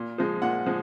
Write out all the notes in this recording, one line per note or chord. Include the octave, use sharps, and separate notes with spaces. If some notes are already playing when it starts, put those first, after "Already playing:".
Already playing: A#2
F3 G#3
A#2 F#5
F3 G#3